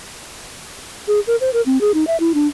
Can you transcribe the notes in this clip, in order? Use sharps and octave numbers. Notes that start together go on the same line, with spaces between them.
G#4
A#4
C5
A#4
C4
G#4
D#4
E5
E4
D4